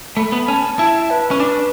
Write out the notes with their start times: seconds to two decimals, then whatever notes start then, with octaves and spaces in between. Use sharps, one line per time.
0.17 A3 B5
0.32 B3
0.47 C#4 A5
0.79 E4 A5
1.10 B4
1.31 C#4
1.40 D4